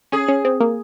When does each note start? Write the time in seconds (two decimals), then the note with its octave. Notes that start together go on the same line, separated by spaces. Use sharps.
0.12 C#4 G#4
0.28 C#4
0.45 C4
0.60 A#3